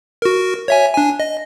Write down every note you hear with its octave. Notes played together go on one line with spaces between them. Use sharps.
F#4 A#4
C#5 E5 G#5
D4 G#5
D#5